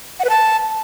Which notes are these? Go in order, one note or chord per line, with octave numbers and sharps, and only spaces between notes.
F#5
B4
A5